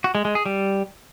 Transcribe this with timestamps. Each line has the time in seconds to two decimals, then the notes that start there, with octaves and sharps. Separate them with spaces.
0.04 F#4
0.15 G#3
0.25 G#3
0.35 G#4
0.46 G3